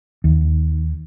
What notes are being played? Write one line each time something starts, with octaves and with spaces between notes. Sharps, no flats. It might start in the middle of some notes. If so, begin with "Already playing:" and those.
D#2